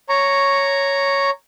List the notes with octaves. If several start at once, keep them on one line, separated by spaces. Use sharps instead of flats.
C#5 A#5 C#6